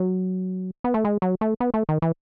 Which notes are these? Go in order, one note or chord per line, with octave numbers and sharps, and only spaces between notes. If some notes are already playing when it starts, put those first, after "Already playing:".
Already playing: F#3
B3
A3
G#3
F#3
A3
B3
A3
D#3
E3